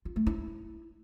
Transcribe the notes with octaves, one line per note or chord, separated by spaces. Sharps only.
F4
A3
E4